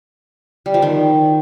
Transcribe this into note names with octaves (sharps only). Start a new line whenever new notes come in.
G3
F3
D#3